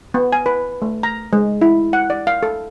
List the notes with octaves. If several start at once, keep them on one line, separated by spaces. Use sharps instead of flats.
B3
G#5
B4
A3
A#5
G#3
E4
F#5
D5
F5
A4